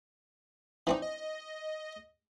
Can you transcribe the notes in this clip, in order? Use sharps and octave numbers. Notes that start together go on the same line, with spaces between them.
E3 C4 D4 D#4
D#5